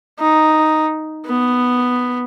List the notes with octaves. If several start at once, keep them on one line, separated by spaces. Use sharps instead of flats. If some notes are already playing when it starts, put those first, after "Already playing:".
D#4
B3